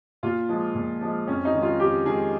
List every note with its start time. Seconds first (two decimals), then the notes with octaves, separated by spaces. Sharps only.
0.23 A#2 F4
0.49 F3 G#3
0.75 A#2
1.01 F3 G#3
1.27 F2 C#4
1.45 D#4
1.53 D#3 G#3
1.62 F4
1.79 F2 G4
2.05 D#3 G#3 G#4